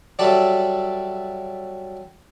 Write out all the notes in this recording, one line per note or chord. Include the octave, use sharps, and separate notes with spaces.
F#3 G3 A4 D5 E5